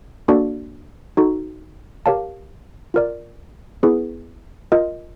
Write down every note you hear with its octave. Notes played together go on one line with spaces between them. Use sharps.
A#3 D4 F#4 A4 D5
D#4 F#4 A4
G4 A#4 C#5 F5 A5
F4 A#4 D5
B3 E4 G#4 B4
F4 A#4 D#5